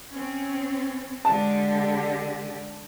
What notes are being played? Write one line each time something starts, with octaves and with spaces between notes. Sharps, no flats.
C4 C#4
D3 G#3 G4 A5